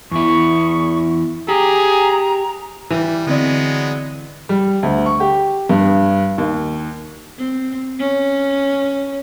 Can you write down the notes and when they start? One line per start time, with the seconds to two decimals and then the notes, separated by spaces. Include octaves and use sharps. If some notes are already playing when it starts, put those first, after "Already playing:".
0.11 E2 E4 C#6
1.48 G4 G#4 A#5
2.90 E3 G3
3.27 D3 F#3 G#3 B3 C4 D5
4.49 G3
4.83 D2
5.06 C#6
5.20 G4
5.69 G2
6.38 D#2
7.38 C4
7.99 C#4